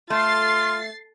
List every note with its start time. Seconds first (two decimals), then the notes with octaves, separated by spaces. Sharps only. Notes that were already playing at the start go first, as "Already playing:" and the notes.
0.10 A3 F4 C6 A6 C7